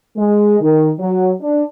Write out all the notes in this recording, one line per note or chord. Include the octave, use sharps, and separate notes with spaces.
G#3
D#3
F#3
D4